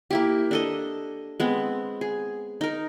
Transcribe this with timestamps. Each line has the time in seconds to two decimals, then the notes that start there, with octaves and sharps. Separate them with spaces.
0.10 A#3 E4 G4
0.51 D4 A4 D#5
1.40 G#3 B3 C4
2.01 G#4
2.61 D#4 A#4